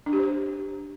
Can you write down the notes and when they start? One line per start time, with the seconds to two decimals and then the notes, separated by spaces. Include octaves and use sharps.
0.06 D4
0.13 G4
0.19 C5